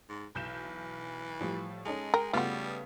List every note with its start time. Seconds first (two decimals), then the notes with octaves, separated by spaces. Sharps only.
0.09 G#2
0.35 B1 E3 G6 E7
1.40 A2 F3 G3
1.85 G#3 C#4 D#4 A4
2.14 A#4 G5
2.33 C#3 G3 A3 B3 F4 F#4